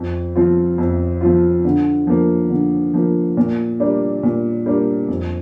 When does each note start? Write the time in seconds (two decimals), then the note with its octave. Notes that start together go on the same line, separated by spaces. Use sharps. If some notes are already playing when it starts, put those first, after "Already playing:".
Already playing: F2
0.36 F3 C4 F4
0.78 F2
1.21 F3 C4 F4
1.65 D3
2.07 F3 A#3
2.50 D3
2.94 F3 A#3
3.37 A#2
3.80 G3 A#3 D4
4.23 A#2
4.66 G3 A#3 D4
5.08 F2